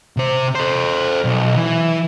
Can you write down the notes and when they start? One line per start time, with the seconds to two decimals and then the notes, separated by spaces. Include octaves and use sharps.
0.17 C3 C5
0.55 A4 C5
1.25 B1
1.56 E3